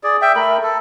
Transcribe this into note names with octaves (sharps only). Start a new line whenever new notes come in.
G#4 D5
E5 G5
A3 A#4 B5
A4